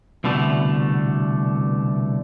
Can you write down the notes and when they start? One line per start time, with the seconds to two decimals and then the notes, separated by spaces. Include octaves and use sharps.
0.24 C2 B2 D3 A3